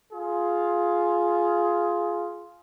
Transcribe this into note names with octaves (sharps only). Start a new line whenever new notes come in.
F4 G#4